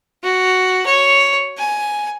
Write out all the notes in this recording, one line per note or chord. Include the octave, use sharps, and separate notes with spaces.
F#4
C#5
G#5